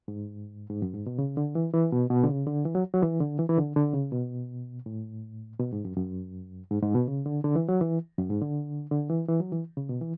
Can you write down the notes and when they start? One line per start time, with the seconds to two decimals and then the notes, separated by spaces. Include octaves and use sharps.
0.08 G#2
0.70 G#2
0.82 F#2
0.94 G#2
1.06 B2
1.19 C#3
1.37 D3
1.55 E3
1.73 E3
1.93 B2
2.10 B2
2.23 D3
2.29 C#3
2.47 D3
2.65 E3
2.75 F#3
2.94 F#3
3.02 E3
3.20 D3
3.39 E3
3.49 E3
3.57 D3
3.76 D3
3.94 C#3
4.12 B2
4.86 A2
5.59 B2
5.73 G#2
5.85 F#2
5.96 F#2
6.71 G#2
6.82 G#2
6.95 B2
7.08 C#3
7.26 D3
7.44 D3
7.56 E3
7.69 F#3
7.81 E3
8.18 F#2
8.30 G#2
8.42 D3
8.91 D3
9.09 E3
9.28 E3
9.40 F#3
9.52 E3
9.77 C#3
9.89 B2
10.01 E3